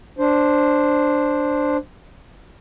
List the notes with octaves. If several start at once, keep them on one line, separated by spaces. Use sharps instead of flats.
D4 C5